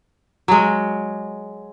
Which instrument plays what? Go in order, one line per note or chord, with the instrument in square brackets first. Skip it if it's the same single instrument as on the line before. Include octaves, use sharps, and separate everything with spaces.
[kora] F#3 G#3